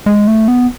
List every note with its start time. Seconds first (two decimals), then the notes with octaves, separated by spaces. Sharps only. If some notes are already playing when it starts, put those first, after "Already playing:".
0.06 G#3
0.27 A3
0.48 B3